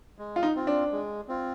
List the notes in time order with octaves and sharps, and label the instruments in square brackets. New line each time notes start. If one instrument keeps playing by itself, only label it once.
[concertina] G#3
[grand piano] F4
D#4
[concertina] C4 F4
[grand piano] D4
[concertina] G#3
C4 F4